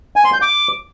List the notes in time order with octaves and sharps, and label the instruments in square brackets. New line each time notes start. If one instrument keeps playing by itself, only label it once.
[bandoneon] G#5
C6
G6
D6